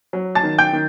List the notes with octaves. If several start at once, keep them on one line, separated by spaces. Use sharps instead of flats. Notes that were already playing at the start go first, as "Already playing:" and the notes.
F#3
A5 A6
D#3
G5 G6
D#3